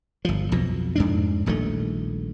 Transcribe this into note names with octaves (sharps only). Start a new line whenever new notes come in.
G1 F3
B1 F2 B2
F2 G#2 D4
D#1 A#1 D#3 A3